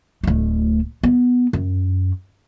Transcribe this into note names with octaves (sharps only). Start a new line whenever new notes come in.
D1 A3
B3
F#2